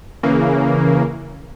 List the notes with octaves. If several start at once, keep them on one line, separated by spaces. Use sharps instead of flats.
C#3 E3 A#3